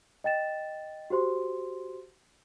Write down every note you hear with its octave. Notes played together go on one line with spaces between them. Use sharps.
D#5 G5 A6 E7
F#4 G4 C5 C6